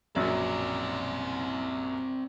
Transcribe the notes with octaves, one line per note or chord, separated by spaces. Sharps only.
A#1 F#2 F#3 C4 D5